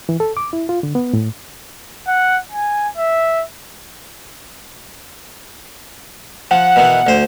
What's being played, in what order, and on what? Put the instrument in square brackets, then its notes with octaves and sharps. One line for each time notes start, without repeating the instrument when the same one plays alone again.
[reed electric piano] E3
A4
D6
E4
F4
D3
B3
A2
[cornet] F#5
G#5
E5
[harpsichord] F3 [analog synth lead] F#5
[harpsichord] B2 D#3 E3
D2 C5